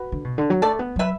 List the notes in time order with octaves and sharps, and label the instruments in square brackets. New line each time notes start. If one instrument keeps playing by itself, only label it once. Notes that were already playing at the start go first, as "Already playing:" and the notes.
Already playing: [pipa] F#4 B4
[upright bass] D3
B2
D3
F#3
[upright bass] A3 [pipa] A4 D5
[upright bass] B3
[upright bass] F#3 [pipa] B4 E5